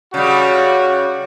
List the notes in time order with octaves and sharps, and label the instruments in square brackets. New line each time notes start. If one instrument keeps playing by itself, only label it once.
[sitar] C#3 G3 [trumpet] F#4